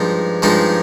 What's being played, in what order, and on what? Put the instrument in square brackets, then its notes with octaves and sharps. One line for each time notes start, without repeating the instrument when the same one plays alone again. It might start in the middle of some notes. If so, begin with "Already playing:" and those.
Already playing: [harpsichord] G2 F3 G#3 D#4 G#4
G2 F3 G#3 D#4 G#4